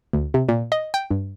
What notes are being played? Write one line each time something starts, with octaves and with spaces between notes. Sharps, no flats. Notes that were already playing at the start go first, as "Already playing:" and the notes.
D2
C3
A#2
D#5
G5
G2